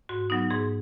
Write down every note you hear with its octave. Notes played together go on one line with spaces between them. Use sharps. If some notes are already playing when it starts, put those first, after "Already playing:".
G#2 F#4
F#3 B3 D#4
G#2 G#4